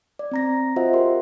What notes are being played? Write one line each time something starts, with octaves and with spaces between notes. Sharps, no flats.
D5
C4 A#5 A#6
F4 F#4 C5 D#5 E5 F#5
G4 A#4 C6